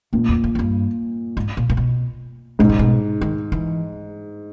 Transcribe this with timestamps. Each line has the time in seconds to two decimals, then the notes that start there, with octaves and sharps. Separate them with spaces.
0.13 E2 A#2
0.29 E2
0.44 F2
0.55 F#2
0.59 G2
1.37 G#2
1.57 A#2
1.70 A#2
1.77 B2
2.59 G#2 B2
2.69 C3
2.79 B2
3.21 D#3
3.52 E3